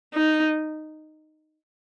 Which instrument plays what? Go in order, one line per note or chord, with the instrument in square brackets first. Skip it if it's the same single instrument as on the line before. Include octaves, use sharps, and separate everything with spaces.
[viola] D#4